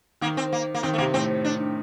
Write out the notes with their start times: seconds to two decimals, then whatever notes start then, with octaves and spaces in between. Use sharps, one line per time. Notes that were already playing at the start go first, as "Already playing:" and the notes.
0.21 D#3 A#3
0.37 C4
0.52 A#3
0.74 A#3
0.83 D#3 C4
0.93 A3
0.98 C3 A#3
1.14 A2 C4
1.45 D4